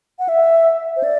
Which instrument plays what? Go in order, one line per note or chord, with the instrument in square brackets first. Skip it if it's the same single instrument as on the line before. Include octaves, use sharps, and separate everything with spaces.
[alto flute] F#5
E5
C5
D5